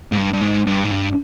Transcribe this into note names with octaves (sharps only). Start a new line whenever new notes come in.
G#2
G2
G2
G#2
G2
G#2
G2